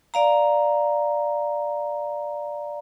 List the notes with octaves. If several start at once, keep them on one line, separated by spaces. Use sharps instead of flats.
D5 F5 A#5